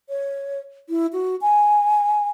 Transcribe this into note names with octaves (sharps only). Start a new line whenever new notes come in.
C#5
E4
F#4
G#5